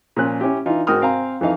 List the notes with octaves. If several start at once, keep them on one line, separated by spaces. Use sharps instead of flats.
A#2 F3 C#4 F#6
C#4 E4 G4
E3 D4 D#4 F4
G#2 F#4 A#4 G5 D#6 F6
C4 F5 G#5 A#5
F2 E3 D#4 F5